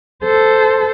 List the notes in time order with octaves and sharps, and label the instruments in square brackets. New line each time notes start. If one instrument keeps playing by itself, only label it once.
[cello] A4 C5